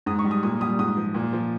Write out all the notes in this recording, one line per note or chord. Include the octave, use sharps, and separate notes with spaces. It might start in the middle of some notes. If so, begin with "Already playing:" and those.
G#2 D#6
C#6
G3
D#6
A#2 D#6
G3 D#6
G#2 D#6
F3
A#2
F3